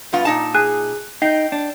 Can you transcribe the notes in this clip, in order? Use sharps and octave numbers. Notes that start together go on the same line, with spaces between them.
G2 B3 F4
A#2 D#4 A5
G#4 F#6
D#4 G5 C7
D4